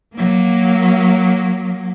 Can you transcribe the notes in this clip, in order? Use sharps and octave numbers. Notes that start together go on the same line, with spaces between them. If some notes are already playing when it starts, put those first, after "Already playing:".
F#3 A#3